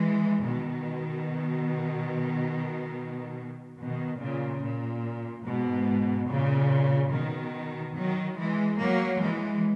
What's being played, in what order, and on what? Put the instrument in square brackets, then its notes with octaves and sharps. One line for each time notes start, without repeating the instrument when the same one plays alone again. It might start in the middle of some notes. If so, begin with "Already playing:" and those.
Already playing: [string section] E3 G#3
B2 D#3
B2 D#3
A#2 C#3
A#2
G#2 B2
A#2 C#3
B2 D#3
D#3 F#3
E3 G#3
F#3 A#3
E3 G#3